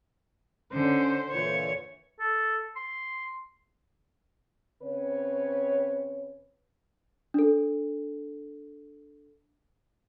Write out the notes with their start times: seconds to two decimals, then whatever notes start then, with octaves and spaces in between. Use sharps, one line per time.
0.73 D3 C#4 C5
1.31 A#2 D3 E3 C#5
2.20 A4
2.75 C6
4.82 C#3 C4 B4 C#5
7.34 D4 A4